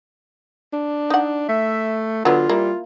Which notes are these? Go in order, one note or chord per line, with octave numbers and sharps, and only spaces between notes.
D4
D#4 F#5
A3 E5
D3 F#3 B3 F4
G3 A#3 E4